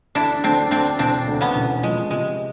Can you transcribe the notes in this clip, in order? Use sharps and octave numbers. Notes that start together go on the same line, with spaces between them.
D2 D4 E4
D2 C4 D4
D2 C4 D4
E1 C4 D4
D2
B3 C#4
E1
F3 G#3
C3 G#3